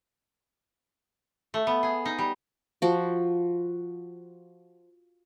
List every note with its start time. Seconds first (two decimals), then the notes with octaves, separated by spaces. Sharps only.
1.54 A3
1.67 B3
1.83 G#4
2.05 D#4
2.18 G3
2.82 F3 F#4